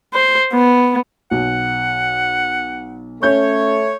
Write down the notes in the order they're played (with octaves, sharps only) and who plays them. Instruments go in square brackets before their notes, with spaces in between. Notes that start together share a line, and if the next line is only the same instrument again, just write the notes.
[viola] C5
B3
[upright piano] B1 [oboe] F#5
[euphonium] A3 [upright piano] C#4 G6 [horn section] C#5